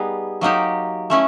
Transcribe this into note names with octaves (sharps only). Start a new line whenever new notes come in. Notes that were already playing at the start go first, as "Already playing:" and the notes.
Already playing: G3 B3 D#4 G#4 B4
F#3 A#3 D#4 G4
A3 C#4 E4